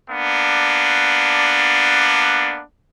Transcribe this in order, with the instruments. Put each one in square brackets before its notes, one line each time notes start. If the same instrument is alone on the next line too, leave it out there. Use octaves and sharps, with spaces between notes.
[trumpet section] A#3 B3 D4